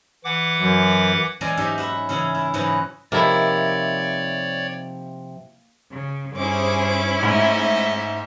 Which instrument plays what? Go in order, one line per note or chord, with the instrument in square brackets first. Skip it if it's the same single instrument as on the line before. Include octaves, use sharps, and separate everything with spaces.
[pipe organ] E3 F#5 D6
[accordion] F#2
[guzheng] E3 G#3 C#4 D5 G#5 A#5
G#2 F#3 C#4 D#4 G4 E5
F#4 B4 E5
C#3 E3 C#4 E4 G#4
E4
G#2 E3 F#3 F#4 B4 D#5
[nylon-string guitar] C3 F3 D#4 [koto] A#3 E4 [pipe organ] C#5 D5
[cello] C#3
[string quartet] G2 D6 [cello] C#4 E4 [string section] G#4 C5
[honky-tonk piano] G#2 [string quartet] A3 C5 D#5 [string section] E5